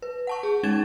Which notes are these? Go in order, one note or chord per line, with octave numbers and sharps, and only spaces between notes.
B4
F#5 A5 C#6
G#4
G#3 C#4 D#4 G#6 A6 E7